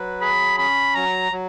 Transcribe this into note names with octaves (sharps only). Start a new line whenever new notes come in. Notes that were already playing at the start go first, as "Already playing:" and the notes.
Already playing: F#3 B4
G#4 B5
C#4 B5
F#3 A#5
F#3